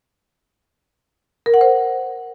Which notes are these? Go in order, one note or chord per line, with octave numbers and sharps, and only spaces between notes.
A#4
F#5
C5